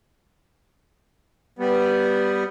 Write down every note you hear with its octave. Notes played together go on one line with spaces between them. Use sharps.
G3 B3